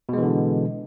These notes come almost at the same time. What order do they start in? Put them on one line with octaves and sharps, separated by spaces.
B2 G#3 E3 D3